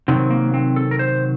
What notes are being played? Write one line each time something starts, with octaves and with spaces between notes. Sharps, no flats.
C3 D#3 F#3 C4
A#3
C4
A4
A#4
C5